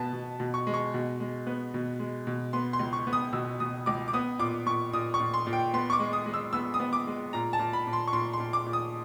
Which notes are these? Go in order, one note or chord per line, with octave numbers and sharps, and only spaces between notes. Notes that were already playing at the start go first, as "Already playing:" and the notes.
Already playing: B2 B3 A5
B2
B2
C#6
G#3
C#6
B2
G#3
B3
B2
G#3
B2
B3 C6
C6
C#2
C#6
B3
D#6
B2 E6
B2 D#6
C#2 D6
D6
B3 D#6
A#2 D6
A#2 C#6
A#2 D#6
C#6
A#2
C6
A#2
G5
B3 C6
C#6
D6
G#3
D#6
G#3
E6
B3 E6
D#6
B3
D6
G#3
A#2 A#5
A5
A#2
B5
A#2
C6
C#6
A#2 C6
C6
A#2
D6
A#2
D#6